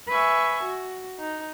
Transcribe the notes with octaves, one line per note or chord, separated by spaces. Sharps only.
B4 E5 G#5 C#6
F#4
D#4